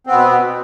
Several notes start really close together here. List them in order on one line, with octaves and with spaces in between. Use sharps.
C4 B3 B2